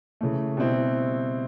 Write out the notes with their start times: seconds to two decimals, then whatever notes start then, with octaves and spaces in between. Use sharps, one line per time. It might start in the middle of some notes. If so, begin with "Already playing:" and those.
0.21 C#3 E3 A3
0.57 B2 G3 C4 E4